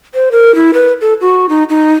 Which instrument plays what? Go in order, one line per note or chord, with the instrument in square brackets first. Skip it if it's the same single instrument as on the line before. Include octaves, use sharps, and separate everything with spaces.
[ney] C5
A#4
E4
B4
A4
F#4
D#4
D#4